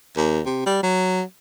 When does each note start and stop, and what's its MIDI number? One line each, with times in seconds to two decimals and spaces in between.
0.17 0.41 39
0.46 0.62 48
0.66 0.80 55
0.83 1.22 54